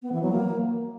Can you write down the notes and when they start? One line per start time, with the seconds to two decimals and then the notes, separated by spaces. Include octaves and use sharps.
0.03 B3
0.12 E3
0.22 F#3
0.31 A#3